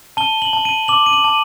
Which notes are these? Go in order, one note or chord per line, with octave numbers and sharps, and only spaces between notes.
A5 G7
F#7
A5
D#7
D6 F#7
D#7
F#7
A5